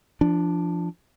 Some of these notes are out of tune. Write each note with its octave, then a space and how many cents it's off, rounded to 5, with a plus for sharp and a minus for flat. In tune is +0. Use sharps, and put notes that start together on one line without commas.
F3 -25 D4 +0